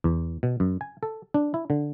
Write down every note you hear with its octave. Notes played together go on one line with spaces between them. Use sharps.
E2
B2
F#2
G#5
A4
D4
E4
D3